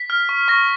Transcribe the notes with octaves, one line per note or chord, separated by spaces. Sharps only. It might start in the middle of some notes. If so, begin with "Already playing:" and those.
Already playing: B6
F6
C#6
C#6 A#6